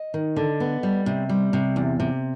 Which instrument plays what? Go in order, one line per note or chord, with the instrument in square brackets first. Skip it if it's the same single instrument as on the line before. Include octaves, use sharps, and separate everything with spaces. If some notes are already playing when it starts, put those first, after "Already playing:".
Already playing: [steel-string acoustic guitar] D#5
D#3
D3
B3
G3
C3
G3
C3
E2
C3